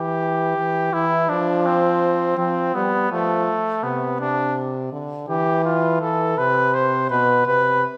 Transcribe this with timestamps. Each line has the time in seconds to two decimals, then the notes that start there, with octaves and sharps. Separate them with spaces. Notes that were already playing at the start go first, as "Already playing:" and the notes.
Already playing: E3 G4
0.57 E3
0.93 E3 E4
1.29 F3 D4
1.66 C4
2.38 F3 C4
2.75 G3 B3
3.11 F3 A3
3.83 C3 B3
4.20 C3 D4
4.92 D3
5.28 E3 G4
5.65 F4
6.01 E3 A4
6.38 C3 B4
6.74 C5
7.10 B2 B4
7.46 C3 B4